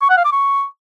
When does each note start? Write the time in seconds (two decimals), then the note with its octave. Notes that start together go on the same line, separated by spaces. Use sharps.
0.02 C#6
0.09 F#5
0.17 F5
0.25 D6
0.32 C#6